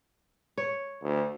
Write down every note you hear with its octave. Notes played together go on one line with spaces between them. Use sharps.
C#5
D2